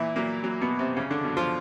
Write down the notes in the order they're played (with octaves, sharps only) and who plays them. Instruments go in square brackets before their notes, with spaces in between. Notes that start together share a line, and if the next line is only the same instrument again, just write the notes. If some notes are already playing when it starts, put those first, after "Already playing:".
Already playing: [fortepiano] A#2 E3 E4
A#2 F#3 A#3
A#2 F#3
B2 B3
F#3
C3 C4
E2 C#3 C#4
D3 D4
B2 F#3
F3 F4